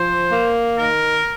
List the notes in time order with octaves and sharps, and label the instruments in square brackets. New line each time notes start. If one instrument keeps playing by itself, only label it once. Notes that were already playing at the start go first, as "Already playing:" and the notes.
Already playing: [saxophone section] F3 [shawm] C5
[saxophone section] A#3
[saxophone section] D#3 [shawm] A#4